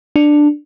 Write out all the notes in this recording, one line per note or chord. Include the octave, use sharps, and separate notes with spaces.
D4